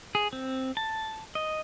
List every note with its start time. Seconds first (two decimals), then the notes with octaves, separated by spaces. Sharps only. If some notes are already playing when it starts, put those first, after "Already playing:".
0.15 G#4
0.33 C4
0.77 A5
1.35 D#5